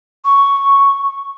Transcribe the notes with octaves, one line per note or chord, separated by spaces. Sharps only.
C#6